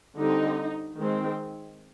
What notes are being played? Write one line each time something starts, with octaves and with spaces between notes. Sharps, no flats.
D3 G3 C4 D#4
D#3 G#3 C4